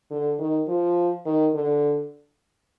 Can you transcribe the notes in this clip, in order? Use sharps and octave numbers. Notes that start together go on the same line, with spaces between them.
D3
D#3
F3
D#3
D3